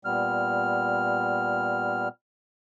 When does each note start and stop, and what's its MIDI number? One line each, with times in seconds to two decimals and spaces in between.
0.05 2.08 46
0.05 2.08 55
0.05 2.08 59
0.05 2.08 89